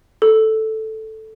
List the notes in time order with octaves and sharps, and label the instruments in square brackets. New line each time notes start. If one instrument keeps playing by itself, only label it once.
[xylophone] A4